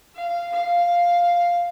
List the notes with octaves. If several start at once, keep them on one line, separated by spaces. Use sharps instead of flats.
F5
F5